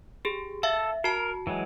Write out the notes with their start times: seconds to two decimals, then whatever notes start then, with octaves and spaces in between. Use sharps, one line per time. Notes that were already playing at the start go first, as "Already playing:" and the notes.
0.25 G4 G#4
0.63 A4 E5 F5
1.04 F#4 A#4 A5
1.47 E3 F#3 G#3